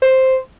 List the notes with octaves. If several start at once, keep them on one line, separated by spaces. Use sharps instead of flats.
C5